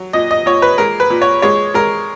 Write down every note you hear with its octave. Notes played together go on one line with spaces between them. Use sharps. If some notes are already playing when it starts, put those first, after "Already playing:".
Already playing: F#3
A#2 D#5
D#5
A#2 C#5
B4
G#3 A#4
B4
A#2
C#5
G#3 C#5
G#3 A#4